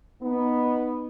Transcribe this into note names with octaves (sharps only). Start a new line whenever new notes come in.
B3 D#4